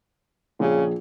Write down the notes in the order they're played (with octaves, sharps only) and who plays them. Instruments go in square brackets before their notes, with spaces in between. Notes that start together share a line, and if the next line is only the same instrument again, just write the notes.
[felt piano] A#1 G#4 [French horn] C#3